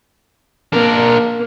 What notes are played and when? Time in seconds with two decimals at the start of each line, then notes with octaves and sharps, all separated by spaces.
0.73 A#3 D4 A#4